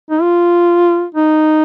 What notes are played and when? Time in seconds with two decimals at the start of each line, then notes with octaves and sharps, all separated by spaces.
0.10 D#4
0.22 F4
1.15 D#4